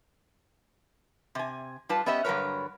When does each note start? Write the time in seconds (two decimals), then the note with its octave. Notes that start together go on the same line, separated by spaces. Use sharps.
1.35 C3 G#5
1.89 G3 F4 B4 A5
2.06 B3 C#4 G4 D#5 E5
2.25 G2 D3 F#3 A#4 B4 C#5